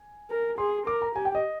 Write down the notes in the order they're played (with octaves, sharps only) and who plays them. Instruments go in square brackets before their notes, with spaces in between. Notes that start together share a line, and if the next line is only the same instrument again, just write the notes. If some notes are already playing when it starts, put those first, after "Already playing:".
Already playing: [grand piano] G#5
[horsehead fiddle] A#4
[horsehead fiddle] G#4 [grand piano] C6
[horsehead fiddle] A#4 [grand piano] D6
[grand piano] A#5
[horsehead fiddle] G4 [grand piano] G#5
[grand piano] G5
D#5